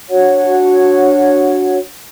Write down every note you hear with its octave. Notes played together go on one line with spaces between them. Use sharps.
D4 F#4 C#5 F#5